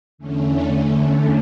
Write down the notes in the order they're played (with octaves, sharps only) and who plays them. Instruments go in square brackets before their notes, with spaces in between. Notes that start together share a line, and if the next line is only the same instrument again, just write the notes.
[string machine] E2 D3 A3 C#4